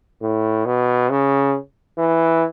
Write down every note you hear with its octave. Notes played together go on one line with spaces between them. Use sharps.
A2
B2
C#3
E3